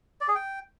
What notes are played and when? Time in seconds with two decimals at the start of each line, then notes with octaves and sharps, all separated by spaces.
0.21 D5
0.28 G#4
0.35 G5